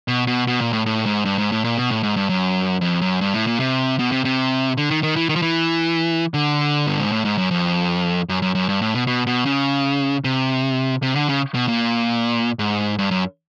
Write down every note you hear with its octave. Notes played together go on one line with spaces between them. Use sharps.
B2
B2
B2
A#2
A2
A2
G#2
G2
G#2
A2
A#2
B2
A2
G#2
G2
F#2
F2
F#2
G2
A2
A#2
C3
B2
C3
C3
D3
D#3
D#3
E3
D#3
F3
E3
D3
G2
G#2
A2
G#2
F#2
F2
F#2
F#2
F#2
G2
A2
B2
B2
B2
C#3
C3
C3
D3
C#3
B2
A#2
G#2
G2
F#2